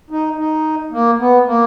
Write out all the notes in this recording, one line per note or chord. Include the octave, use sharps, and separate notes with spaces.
D#4
D#4
A#3
B3
A#3